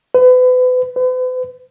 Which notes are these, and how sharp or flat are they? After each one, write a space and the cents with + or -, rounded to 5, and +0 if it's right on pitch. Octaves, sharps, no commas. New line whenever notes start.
B4 +35
B4 +45